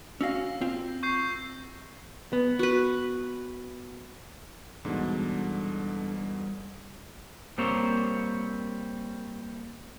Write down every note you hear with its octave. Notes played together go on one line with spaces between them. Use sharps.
C#4 F#4 F5 E6 A#6
C4 F4
C#6 G6 C7
B3
F#4 B4
E2 G#2 B2 D3 G3
G3 A#3 C4 C5 C#5